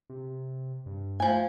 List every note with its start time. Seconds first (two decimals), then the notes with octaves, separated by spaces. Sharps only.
0.10 C3
0.86 G2
1.20 F3 A3 G#5